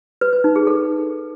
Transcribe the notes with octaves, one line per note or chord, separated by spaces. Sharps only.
B4
B4
D#4
G#4
A4